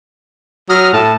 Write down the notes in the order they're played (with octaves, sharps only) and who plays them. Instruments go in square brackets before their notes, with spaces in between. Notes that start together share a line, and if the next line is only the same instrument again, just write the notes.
[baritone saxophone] F#3 [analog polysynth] D#6 F6 A#6
[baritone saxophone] A2 [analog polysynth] A5